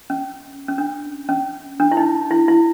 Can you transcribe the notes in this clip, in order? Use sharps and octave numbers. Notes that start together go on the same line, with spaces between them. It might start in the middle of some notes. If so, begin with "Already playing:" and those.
C#4
C#4
D4
C#4
D4
E4
D#4
E4
E4